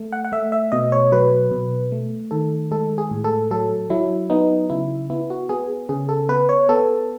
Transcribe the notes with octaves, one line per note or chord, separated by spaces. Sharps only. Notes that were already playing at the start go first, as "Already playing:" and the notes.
Already playing: A3
F#5
F#5
A3 E5
E5
B2 D#5
C#5
F#3 B4
B2
A3
D#3 A4
G#3 A4
G#4
A2
A4
F#3 A4
F#3 E4
B3 D#4
C#3 E4
B3 E4
F#4
B3 G#4
C#3 G#4
A4
B3 B4
C#5
B3 A4